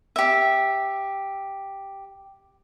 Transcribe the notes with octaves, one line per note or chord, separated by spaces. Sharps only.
G4 E5